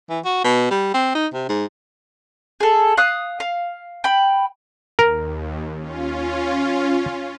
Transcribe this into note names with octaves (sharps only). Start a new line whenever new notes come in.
E3
F#4
B2
G3
C4
D#4
C3
G#2
G#4 A4
F5 D#6 F#6
F5
G5 B5
D#2 A#4
C#4 F4